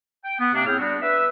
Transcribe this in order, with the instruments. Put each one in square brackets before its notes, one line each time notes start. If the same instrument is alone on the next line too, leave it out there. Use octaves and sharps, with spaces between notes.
[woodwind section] G5
B3
C3 A#3 C4 D4
A2 C4 G#4 G5 F6
G3 B3 D4 F#4
B4 E5